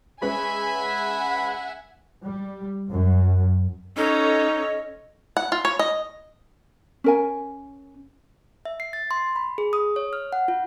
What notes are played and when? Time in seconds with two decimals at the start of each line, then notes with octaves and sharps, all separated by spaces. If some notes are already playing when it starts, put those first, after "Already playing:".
0.22 G#3 C#4 B4 E5 G#5 B5
0.79 F#5
2.24 G3
2.91 F#2
3.97 C#4 D#4 A4 C#5 D#5
5.37 F#5
5.52 F4
5.65 C#5
5.79 D#5
7.04 C#4 A#4 G#5
8.65 E5
8.80 C7
8.93 A6
9.11 C6
9.36 B5
9.58 G#4
9.73 D#6
9.96 C#5
10.13 F6
10.33 F#5
10.48 F4